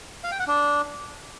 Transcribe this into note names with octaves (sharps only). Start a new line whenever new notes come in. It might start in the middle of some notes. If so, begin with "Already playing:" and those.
F5
G5
F#5
D4